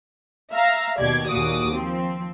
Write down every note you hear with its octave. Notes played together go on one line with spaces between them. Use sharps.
E5 F5 A#5
D#2 B2 G4 D5 G#6
D#2 A#2 F#4 D6 D#6
F3 C4